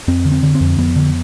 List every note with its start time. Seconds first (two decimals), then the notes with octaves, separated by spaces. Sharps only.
0.08 F2 C4
0.25 D3
0.32 C4
0.43 D3
0.55 C4
0.60 F2
0.78 F2 B3
0.96 D3